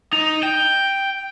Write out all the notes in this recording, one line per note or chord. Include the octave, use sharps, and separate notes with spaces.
D#4
G5